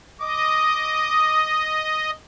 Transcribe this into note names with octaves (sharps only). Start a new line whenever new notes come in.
D#5 D6 D#6